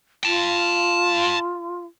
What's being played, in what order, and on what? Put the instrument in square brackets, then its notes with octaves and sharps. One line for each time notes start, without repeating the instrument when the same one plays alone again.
[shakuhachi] F4 [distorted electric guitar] G5 A5